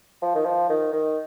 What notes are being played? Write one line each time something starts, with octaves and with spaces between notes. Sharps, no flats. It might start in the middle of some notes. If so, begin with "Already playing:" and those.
F3
D#3
F3
D#3
D#3